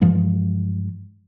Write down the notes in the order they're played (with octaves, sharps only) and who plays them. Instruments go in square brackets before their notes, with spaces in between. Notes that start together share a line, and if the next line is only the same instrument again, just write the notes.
[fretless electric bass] G2 E3 F3 G#3